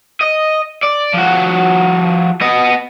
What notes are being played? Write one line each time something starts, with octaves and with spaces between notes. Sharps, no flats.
D#5
D5
F3 F#4
B3 D#5